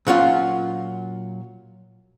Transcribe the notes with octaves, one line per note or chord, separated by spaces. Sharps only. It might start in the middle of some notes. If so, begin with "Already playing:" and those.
A#2 F#3 C#4 F4 F#5